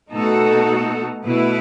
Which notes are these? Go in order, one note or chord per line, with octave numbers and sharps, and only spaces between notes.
B2 A3 D#4 F#4 A4
B2 A3 E4 B4